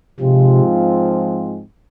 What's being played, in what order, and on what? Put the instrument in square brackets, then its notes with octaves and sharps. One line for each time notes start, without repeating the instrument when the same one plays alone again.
[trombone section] G#2 F3 G#3 C4 F4 [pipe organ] C3